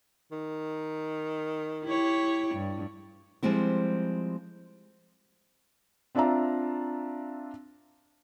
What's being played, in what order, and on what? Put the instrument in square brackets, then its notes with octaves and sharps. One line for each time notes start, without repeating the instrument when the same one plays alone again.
[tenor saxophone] D#3
[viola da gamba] E4 G4 C#5
G2
[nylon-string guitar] F3 G3 G#3 C4 E4
[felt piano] C4 D4 F4 D5 E5 A#5